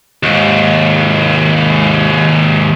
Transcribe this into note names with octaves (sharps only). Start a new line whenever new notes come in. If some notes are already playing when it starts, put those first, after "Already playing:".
D#2 G#2